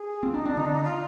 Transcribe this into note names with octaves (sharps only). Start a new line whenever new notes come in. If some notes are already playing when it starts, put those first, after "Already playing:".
Already playing: G#4
C4 F4
D4 D#4
C4 D4
D3 D#4
D4
D#4
F4